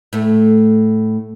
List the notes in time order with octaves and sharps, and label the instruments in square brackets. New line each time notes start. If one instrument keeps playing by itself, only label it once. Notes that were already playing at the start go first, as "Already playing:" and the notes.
[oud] A2 A3